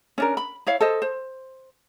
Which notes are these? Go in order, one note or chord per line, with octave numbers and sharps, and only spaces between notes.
C#4 D4 A#4
B5
E4 C#5 F5
A4 C5 D#5
C5